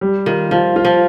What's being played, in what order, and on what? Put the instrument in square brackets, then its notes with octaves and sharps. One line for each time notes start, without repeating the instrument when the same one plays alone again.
[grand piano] G3
[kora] D#3 [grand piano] F4
[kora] F3 [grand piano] F4
[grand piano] F4
[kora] F3